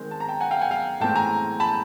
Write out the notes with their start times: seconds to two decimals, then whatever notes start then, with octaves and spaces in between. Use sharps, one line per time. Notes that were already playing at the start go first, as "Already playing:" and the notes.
Already playing: D#3 G#3 C4
0.11 A5
0.20 A#5
0.29 G5 A5
0.41 F#5 G#5
0.51 F5 G5
0.61 F#5 G#5
0.71 F5 G5
1.00 A2 E3 G#3 C4 G5 A5
1.15 G#5 A#5
1.60 A5 B5